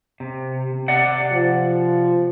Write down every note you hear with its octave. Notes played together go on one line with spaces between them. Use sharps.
C3
C3 D5 F#5
F3